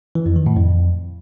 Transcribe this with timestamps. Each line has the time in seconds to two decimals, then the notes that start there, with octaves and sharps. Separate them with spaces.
0.15 E3
0.26 F2
0.36 D#3
0.46 A2
0.57 F2